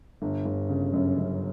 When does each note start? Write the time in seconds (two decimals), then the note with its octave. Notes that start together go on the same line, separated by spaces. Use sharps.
0.22 G1
0.45 G1
0.69 C#3
0.93 F#2
1.18 F#2